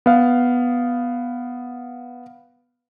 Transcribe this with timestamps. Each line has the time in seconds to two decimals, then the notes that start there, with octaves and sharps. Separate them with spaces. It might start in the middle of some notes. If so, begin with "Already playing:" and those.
0.06 B3 F5